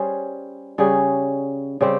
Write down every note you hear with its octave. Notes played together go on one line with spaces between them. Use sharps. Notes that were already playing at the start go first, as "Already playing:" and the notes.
Already playing: G3 C#4 G#4 C5
C#3 G3 C#4 G#4
C#3 G3 C4 G4